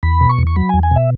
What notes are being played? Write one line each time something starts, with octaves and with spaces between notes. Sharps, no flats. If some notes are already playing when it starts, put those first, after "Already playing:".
E2 B5
B2
C#6
E2
C#6
F#3 B5
E2 G#5
G#5
B2 E5